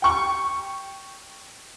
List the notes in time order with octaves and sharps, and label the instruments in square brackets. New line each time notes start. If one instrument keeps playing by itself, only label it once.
[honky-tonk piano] G5 C#6